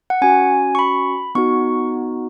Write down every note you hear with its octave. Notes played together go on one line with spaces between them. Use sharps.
F#5
C#4 F#4 G#5
C#6
B5
B3 D#4 F#4 C#6